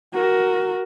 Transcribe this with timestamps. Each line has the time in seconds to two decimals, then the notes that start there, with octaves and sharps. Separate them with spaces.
0.14 F#4 A#4